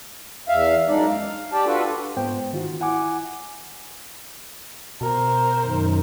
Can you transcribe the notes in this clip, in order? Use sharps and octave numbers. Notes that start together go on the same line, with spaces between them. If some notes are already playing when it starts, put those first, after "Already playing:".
E2 E5 F5
F#2 G#3 D4 D#4 D5
F5
G4 D5 G5 A5
D4 F4 F#4 A4 B4
G#2 B3 C5 G5
D#3 F4 F#4
E4 F#5 G#5 D6
B2 A#4 C5
F#2 D#3